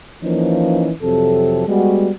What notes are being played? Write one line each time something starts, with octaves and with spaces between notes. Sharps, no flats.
E3 F3 A#3 C#4 D#4
F2 C3 F#3 A4
G3 G#3 B3 F#4